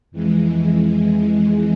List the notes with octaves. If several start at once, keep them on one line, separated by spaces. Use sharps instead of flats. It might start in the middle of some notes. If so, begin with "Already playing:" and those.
F2 E3 G#3